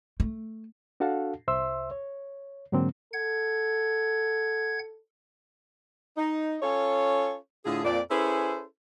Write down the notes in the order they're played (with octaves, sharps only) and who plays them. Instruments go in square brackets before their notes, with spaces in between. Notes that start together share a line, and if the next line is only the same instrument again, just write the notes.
[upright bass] A3
[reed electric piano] D4 F#4 A4 F5 F#5 A5
C2 C5 E5 C6 E6
C#5
G#2 D3 F#3 A#3 C4
[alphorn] A4 [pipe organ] F#5 G#6
[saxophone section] D#4
C#4 F4 A4 C#5
A2 D3 F4 G#4
F2 A#2 D5
C#4 E4 G#4 A4 B4 C5